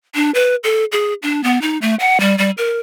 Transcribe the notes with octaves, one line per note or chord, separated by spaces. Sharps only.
D4
B4
A4
G#4
D4
B3
D#4
A3
F#5
G3
G3
A#4